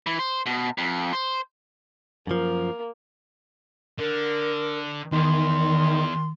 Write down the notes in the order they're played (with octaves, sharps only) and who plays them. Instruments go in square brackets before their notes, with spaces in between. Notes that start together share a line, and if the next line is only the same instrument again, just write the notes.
[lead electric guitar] E3
C5
B2
F2
C5
[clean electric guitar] F#2 F3 [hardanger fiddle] A#3
[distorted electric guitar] D3 [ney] A#4
[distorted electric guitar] E2 [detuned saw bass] D#3 [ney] C6